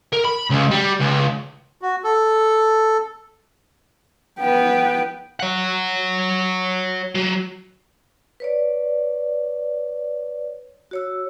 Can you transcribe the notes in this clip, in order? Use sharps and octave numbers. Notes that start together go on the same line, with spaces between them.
A#4
B5
C#2
G3
C#2
F#4
A4
B3 B4 G5
C#5 F#5
F#3
B4 C#5 D5
F#4 C#5 E6